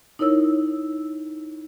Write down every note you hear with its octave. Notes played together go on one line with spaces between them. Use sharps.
D#4 E4 A#4 C#5 E6